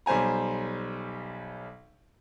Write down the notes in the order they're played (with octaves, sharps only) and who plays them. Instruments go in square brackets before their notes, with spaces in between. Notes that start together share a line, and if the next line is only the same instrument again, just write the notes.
[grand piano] B1 G3 C5 G#5 A#5